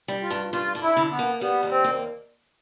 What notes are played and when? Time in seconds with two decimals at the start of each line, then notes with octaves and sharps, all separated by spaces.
0.08 G3
0.23 F4
0.31 G2
0.53 G2 F4
0.75 D3
0.82 E4
0.97 D3
1.11 B3
1.19 A#3
1.41 G3 B3
1.63 D#2
1.70 C4
1.84 A#3